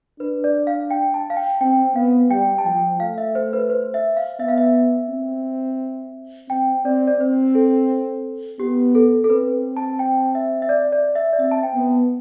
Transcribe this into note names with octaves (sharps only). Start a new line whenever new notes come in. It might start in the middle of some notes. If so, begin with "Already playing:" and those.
D4 B4
D5
F5
G5
A5
F5
G5
C4 G5
B3 F5
G3 G5
A5
F3 G5
A3 F5
E5
C5
B4
C5
E5
F5
B3 E5
F5
E5
C4
C4 G5
C4 D5
D5
C4 C5
A4
B3 G4
A4
A4
C4 B4
A5
G5
E5
E5
D5
D5
E5
D5
C4 E5
A5
G5
B3